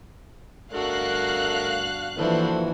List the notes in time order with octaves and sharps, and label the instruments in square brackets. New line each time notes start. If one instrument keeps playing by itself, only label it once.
[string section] G1 F5 F#6 [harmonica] A3 A#4 [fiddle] D4 F#4
[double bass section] E3 F3 A#3 [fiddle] D4 F#4 [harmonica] A4 C5